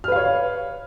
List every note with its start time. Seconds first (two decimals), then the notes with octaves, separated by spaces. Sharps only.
0.04 F6
0.08 B4
0.12 F5
0.16 C#5